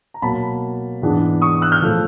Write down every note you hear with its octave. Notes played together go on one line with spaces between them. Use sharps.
A#5
B2 F#3 A#3 A5 B5
G#2 E3 G#3 B3 D4
C#6 D#6
E6 F#6
F6 G6
A2 F3 A3